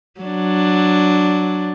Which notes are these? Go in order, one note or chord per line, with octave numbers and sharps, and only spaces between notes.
F#3 D4